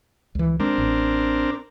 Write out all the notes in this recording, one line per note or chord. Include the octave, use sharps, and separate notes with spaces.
C#2 E3
G#3 C4 D4 A#4
A1